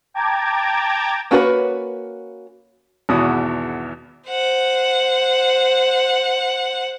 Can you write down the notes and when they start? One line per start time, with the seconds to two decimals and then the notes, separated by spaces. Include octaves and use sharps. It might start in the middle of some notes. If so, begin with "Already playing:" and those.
0.14 G5 A5 A#5 D6 G#6
1.31 A#3 C#4 F#4 A4 B4
3.09 G#1 E2 B2 F#4 D#6
4.28 C5 F#5